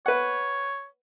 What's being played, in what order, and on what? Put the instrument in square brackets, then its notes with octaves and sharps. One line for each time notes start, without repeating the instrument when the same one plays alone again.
[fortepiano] B4 F#5 [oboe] C#5